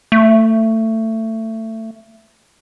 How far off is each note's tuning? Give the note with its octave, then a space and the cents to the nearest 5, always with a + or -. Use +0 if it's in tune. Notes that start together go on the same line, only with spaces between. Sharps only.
A3 +20